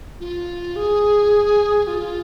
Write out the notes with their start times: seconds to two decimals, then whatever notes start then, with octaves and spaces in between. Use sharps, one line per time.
0.20 F4
0.76 G#4
1.87 F4